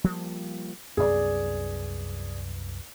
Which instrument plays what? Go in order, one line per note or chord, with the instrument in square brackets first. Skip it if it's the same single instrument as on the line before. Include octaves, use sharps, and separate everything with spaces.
[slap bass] F3 G3 A#3
[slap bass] C2 F#2 B3 [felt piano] G#4 D5